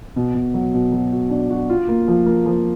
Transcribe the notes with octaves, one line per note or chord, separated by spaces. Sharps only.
B2
B2
F#3
B2
F#3
F#4
D4
F#4
F4
A#3
F3
A#3
F3